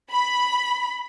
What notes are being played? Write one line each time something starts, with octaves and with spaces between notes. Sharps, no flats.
B5